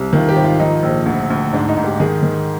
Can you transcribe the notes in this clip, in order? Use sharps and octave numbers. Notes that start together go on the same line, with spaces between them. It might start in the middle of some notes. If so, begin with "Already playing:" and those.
Already playing: C2
D#3 F4
G4
G#1
F4
F3 D#4
A#1
D2
D2
G#2 D4
D#4
G#2
G4
D#3 G#4
D#3